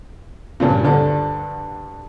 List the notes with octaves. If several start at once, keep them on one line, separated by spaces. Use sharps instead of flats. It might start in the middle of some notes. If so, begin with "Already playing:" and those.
G2 A#2 C#3
D2 G2 D3 D5